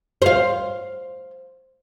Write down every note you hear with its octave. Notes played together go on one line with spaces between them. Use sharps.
C5 F5